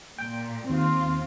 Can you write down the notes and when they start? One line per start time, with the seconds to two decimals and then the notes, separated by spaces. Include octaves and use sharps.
0.18 A#2 G5
0.70 D#2 C4 F4